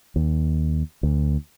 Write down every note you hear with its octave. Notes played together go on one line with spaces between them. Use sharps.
D#2
D2